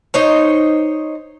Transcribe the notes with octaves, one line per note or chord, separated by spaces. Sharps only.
D#4 C5 C#5